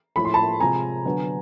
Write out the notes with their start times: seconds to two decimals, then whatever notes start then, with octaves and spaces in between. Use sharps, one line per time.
0.16 A2 F3 A3 B5
0.25 C6
0.34 A5 B5
0.60 C3 F3 G#3 C4 G#5 A#5
1.05 D3 F#3 B3